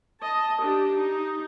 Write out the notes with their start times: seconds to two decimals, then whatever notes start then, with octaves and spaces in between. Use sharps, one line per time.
0.21 D#5 A5
0.62 D4 G4
0.97 D#4